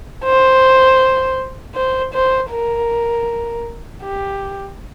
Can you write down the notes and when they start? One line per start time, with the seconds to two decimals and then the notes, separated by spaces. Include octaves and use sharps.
0.24 C5
1.75 C5
2.13 C5
2.50 A#4
4.03 G4